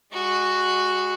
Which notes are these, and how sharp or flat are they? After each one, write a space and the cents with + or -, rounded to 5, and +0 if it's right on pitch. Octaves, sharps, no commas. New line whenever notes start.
G#3 -25 F#4 +0